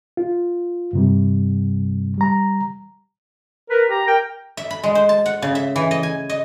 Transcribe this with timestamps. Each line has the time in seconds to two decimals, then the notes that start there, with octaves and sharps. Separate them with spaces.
0.17 F4
0.93 G2 C3 G3
2.18 G3 A#5
3.70 A#4 B4
3.90 G4 A#5
4.07 A#4 G5
4.57 E5
4.71 B5
4.83 G#3
4.95 C5
5.09 A5
5.26 F#5
5.42 C#3
5.55 E5
5.76 E3
5.91 D#5
6.03 G#5
6.29 D#5